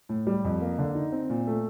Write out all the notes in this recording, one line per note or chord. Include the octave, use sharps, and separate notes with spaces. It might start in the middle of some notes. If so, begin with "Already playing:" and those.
A2
G3
F2
A#3
D3
D#4
C4
A#2
A3